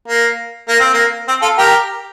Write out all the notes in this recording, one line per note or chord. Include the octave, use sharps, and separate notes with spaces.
A#3
A#3
C4
A#3
C4
F4 A4
G4 A#4